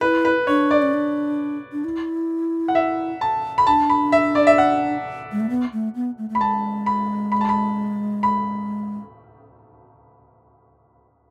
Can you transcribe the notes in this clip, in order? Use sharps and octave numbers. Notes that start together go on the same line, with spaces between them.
E4 B4
B4
D4 C#5
D5
C#4
D4
D4
E4
F#5
E5
A5
B5
D4 A5
B5
E5
D5
E5
F#5
G#3
A3
B3
A3
B3
A3
A3
B5
G#3 A5
B5
B5
A5
B5
B5